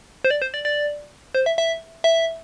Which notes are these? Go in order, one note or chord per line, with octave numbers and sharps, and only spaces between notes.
C5
D5
C5
D5
D5
C5
E5
E5
E5